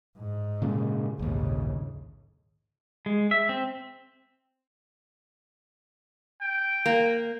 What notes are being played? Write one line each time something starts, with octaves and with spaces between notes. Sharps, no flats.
G#2
A#2 C#3 G#3
A#1 D#2 G#2 C#3
G#3
E5
C4
G5
A#3